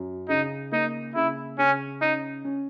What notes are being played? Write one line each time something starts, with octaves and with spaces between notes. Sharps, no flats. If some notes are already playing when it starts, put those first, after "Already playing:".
Already playing: F#2
C#3 D#4
A#3 D#4
C#3 E4
C#3 C#4
C#4 D#4
C#4